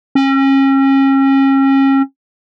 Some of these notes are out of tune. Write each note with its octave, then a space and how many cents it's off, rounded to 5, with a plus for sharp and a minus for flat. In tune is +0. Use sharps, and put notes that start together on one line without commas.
C#4 -35